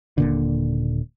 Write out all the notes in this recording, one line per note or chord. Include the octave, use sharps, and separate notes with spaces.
D#1 A#2 D3